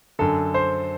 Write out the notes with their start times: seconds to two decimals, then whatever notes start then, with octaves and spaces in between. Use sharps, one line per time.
0.19 F#2 D3 A4
0.54 C5